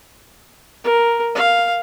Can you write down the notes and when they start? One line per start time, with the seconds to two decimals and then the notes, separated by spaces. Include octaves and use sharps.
0.84 A#4
1.35 F5